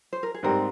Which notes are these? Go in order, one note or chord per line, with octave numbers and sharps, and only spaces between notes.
C5
A#4
G#4
G#2 G3 C4 G4 A#4